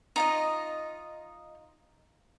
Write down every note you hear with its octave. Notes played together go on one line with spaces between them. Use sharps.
D#4 F4 D#5